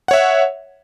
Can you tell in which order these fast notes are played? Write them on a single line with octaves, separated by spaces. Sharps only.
F#5 C#5 E5